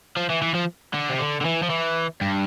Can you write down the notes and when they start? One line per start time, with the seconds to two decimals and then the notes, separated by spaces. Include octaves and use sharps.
0.16 F3
0.30 E3
0.42 E3
0.54 F3
0.94 D3
1.10 C3
1.19 D3
1.41 D3
1.45 E3
1.63 F3
1.70 E3
2.21 G2